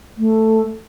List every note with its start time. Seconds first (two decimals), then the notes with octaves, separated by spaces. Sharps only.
0.18 A3